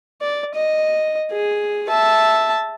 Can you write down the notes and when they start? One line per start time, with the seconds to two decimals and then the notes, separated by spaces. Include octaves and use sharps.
0.21 D5
0.55 D#5
1.31 G#4
1.89 E5 A5